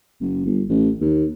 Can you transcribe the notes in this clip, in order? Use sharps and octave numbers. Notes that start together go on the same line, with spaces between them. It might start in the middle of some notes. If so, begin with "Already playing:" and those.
F#1
G1
A1
D#2